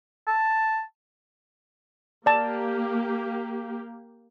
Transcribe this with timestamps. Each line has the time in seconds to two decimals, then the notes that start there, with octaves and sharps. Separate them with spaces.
0.27 A5
2.26 A#3 G4 D5 A5